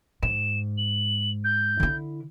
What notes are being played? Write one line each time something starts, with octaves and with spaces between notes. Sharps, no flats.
G#2 E7
F#7
G6
D3 E4